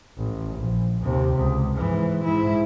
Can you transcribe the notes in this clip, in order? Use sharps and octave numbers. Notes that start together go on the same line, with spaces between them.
A1
A#1
D#2 C3
C#2
G#2 E3
G#2 E4